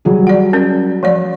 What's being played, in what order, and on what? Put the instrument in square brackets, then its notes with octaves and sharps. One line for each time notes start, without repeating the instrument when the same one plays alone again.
[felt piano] F#3 G3 G#4
[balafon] D5 F#5
C#4 A#4
F3 A3 D5